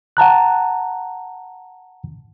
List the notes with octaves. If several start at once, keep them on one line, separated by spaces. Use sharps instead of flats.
F#5 A5 A#5 F#6